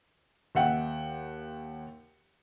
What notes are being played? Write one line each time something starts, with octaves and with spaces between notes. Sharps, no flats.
D#2 E5 F#5 G5